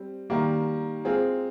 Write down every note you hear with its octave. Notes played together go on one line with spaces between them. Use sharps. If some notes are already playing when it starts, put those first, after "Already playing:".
Already playing: G3 C4
D#3 G3 A#3
G#3 C4 F4 G#4